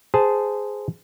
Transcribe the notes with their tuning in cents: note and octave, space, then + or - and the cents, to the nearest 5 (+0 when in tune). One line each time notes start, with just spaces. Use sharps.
G#4 +0 C5 -20 A5 +0